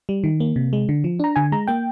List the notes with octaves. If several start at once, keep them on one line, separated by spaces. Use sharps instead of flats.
G3
D#3
A#3
C3
G#3
D3
F3
D4 A#5
D3 G#5
G#3 A#5
A#3 G5